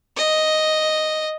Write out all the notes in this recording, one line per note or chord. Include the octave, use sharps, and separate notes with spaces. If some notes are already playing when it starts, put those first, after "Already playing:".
D#5